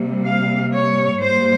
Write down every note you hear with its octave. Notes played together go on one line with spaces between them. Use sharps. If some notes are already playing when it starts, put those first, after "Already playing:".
Already playing: C3 G3 A#3
F5
C#5
G#2 G3 A#3 C5